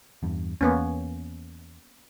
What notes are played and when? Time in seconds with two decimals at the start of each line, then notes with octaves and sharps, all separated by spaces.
0.23 E2 G2
0.61 E2 A#3 B3 C#4